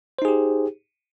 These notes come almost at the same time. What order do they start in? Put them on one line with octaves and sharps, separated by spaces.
C5 D#4 G#4 G4